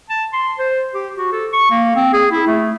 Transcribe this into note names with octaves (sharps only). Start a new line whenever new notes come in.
A5
C6
C5
G4
F#4
A4
C#6
A#3
C4
G#4
E4
A3